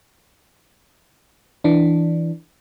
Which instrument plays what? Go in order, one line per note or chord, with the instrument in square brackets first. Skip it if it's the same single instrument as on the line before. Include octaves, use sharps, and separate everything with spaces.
[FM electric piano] E3 D4